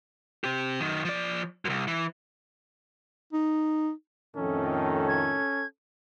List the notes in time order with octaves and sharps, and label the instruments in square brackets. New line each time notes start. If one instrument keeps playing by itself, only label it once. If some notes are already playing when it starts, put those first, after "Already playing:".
[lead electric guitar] C4 G4
F#2 D#3
F3 D5
C2 F#2
E3
[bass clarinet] D#4
[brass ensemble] F2 A2 D#3 [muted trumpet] C#4 [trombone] A4
[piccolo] G#6